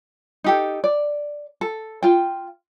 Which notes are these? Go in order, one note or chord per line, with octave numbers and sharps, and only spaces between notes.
D#4 G4 A4
D5
A4
F4 G5